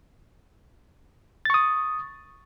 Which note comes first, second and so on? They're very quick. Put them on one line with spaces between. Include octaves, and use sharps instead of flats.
A6 C#6 D#6